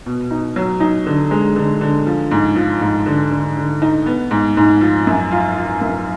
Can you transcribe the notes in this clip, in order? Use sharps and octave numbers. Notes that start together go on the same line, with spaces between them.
B2
D#4
F#3
D#4
D3
G#3
D3
D3
F3
G#2
F3
G#2
D3
D3
D3
D#4
B3
G#2
G#2
F3
F#2
F4
F4
F#2